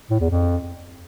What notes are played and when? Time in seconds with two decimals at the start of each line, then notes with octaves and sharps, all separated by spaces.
0.10 A2
0.20 E2
0.30 F2